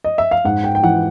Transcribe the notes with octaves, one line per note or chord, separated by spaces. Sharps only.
D#5
E5
F5
G#2 F#5
G5
G5
E3 F#5